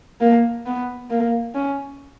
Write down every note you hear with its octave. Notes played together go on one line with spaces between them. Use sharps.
A#3
B3
A#3
C#4